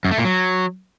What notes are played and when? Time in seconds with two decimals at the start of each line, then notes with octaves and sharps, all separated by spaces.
0.05 F#2
0.11 A3
0.18 A#2
0.24 F#3